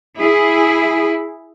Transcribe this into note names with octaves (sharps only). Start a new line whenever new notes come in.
E4 G#4